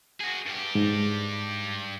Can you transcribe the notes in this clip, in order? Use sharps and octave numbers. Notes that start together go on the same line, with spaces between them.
F#4 G#4
G2 G4
G#2